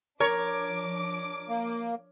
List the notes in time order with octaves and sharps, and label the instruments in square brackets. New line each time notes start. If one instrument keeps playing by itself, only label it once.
[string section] F3 D4 D6 [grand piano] A#4 [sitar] C#5
[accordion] A#3